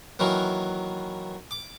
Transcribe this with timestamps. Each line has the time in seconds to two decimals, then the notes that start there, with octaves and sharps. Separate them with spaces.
0.19 D#3 E3 F#3 A#3
1.51 D6